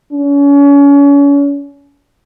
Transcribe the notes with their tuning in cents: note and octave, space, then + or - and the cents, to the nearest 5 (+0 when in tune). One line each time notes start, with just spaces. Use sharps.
C#4 +35